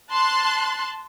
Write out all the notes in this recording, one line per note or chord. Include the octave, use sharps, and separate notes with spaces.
A5 C6 F#6